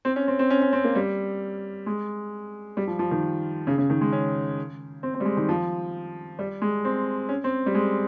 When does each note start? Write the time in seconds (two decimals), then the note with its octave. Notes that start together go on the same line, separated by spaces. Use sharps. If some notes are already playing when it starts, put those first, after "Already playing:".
0.05 C4
0.16 C#4
0.28 C4
0.39 C4
0.50 C#4
0.62 C#4
0.73 C4
0.84 A#3
0.95 G3
1.86 G#3
2.77 G3
2.87 F3
2.99 F3
3.11 D#3
3.67 C#3
3.78 C#3
3.90 D#3
4.01 G#3
4.12 C#4
5.03 C4
5.14 C4
5.20 G3
5.25 G#3
5.37 D#3
5.49 F3
6.39 G3
6.62 G#3
6.85 C4
7.29 C#4
7.44 C4
7.66 G3
7.75 G#3